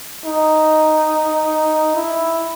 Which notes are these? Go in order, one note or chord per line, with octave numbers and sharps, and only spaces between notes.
D#4
E4